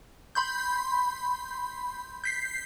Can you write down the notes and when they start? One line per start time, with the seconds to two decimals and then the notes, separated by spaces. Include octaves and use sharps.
0.35 B5 C6 G6
2.24 G6 B6 C7